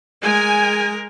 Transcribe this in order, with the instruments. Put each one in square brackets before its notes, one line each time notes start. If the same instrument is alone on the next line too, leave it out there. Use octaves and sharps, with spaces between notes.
[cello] G#3 A#4 [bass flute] G#4 [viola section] G#5